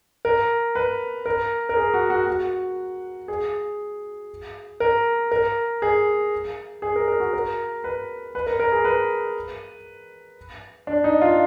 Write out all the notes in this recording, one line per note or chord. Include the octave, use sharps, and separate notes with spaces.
A#4
B4
A#4
A#4
G#4
F#4
F#4
F#4
G#4
A#4
A#4
G#4
G#4
A#4
A#4
F#4
A#4
B4
B4
A#4
A#4
G#4
B4
D4
D#4
F4